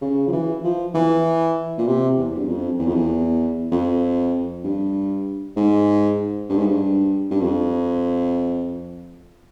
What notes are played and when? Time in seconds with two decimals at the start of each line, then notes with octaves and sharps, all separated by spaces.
0.02 C#3
0.28 F3
0.33 E3
0.64 F3
0.94 E3
1.78 A#2
1.87 C3
2.17 E2
2.37 G2
2.49 F2
2.79 E2
2.87 F2
2.95 E2
3.72 F2
4.64 G2
5.57 G#2
6.49 G2
6.58 G#2
6.66 G2
7.31 G2
7.42 F2